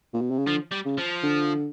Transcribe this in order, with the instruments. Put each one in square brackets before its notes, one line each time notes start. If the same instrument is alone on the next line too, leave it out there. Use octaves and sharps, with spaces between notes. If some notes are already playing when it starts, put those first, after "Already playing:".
[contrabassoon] A#2
B2
C3
C#3
[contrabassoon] D3 [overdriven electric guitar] F3
[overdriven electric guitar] G3
[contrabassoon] C#3
[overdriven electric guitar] F3
[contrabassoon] D3